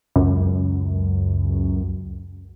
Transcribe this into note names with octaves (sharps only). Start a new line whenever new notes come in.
C#2 F#2